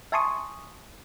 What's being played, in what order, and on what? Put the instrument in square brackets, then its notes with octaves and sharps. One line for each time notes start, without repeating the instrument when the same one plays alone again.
[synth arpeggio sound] E5 G#5 A5 C6 C#6 D#6